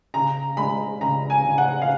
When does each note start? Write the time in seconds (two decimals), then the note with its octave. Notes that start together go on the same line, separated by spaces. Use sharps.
0.14 C#3 A#5
0.57 G#3 B5
1.01 C#3 A#5
1.30 G#5
1.44 C#3
1.58 F#5
1.82 F5